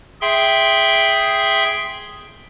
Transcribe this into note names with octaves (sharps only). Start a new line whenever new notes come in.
G#4 E5 G5 C6